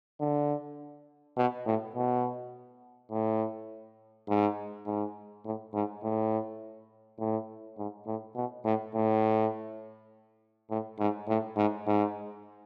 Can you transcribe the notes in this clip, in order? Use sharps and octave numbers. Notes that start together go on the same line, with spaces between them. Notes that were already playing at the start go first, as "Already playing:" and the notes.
D3
B2
A2
B2
A2
G#2
G#2
A2
G#2
A2
A2
G#2
A2
B2
A2
A2
A2
G#2
A2
G#2
G#2